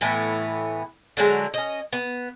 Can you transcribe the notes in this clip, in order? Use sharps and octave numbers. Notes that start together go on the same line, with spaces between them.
A2 E3 B3
D3 F#3 G#3
C#4 D#5
B3